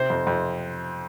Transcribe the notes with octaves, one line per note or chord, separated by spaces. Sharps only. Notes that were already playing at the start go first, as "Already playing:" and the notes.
Already playing: C3 C5
F2
F2